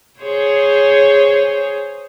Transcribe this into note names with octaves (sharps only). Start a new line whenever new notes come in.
G#4 C5 C#5